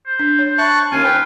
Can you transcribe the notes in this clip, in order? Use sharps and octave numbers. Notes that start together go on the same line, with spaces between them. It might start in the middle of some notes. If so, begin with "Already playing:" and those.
C5
D4
C#5
E5 A5 B5 C#6 F#6
D#2 C#4 F4 G#5
B4 G5